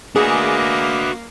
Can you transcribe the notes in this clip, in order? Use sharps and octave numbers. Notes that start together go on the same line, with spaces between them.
A#3 D4 F#4 G#4 B4 D#5 D6